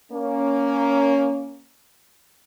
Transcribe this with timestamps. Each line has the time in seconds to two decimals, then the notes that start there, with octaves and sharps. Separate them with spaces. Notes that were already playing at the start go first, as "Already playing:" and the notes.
0.12 A#3 C#4